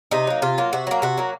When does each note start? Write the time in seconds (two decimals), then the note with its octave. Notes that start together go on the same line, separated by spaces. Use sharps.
0.11 C3 D#4
0.27 F#3 A#3
0.42 C3 F4
0.58 F#3 A#3
0.73 C3 F#4
0.87 F#3 A#3
1.02 C3 F#4
1.17 F#3 A#3